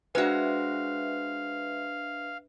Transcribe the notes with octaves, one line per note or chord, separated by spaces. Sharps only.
G#3 D4 F#4 B4 C5 E5 F5